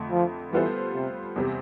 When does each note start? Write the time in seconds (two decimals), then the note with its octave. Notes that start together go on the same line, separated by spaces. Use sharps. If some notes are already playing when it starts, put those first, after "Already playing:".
Already playing: F2 D3 A3
0.12 F3
0.52 E3 G3 B3 F4 A4 C5
0.94 C3
1.36 E2 C3 G3